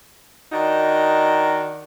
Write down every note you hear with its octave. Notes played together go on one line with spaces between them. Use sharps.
D#3 D4 D#4 F#4